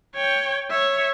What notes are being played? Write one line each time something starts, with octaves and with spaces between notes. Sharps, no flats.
C#5 G5
C#5 E5